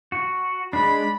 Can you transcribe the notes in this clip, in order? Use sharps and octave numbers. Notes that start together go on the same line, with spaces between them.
F#4
G#3 D4 B5